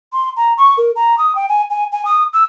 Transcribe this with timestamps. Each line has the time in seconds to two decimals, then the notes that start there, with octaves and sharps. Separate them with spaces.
0.13 C6
0.36 A#5
0.58 C#6
0.78 A#4
0.96 A#5
1.18 D#6
1.36 G5
1.49 G#5
1.70 G#5
1.92 G#5
2.05 D#6
2.33 E6